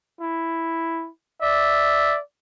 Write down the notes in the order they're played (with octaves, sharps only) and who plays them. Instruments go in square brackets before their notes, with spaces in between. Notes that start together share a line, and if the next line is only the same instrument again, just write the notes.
[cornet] E4
[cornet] D5 [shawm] E5